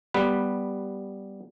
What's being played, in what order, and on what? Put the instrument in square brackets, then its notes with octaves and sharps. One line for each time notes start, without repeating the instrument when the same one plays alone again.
[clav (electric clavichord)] G3 B3 B4